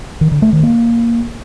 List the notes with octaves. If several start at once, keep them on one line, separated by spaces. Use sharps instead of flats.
D#3
D3
A3
D#3
A#3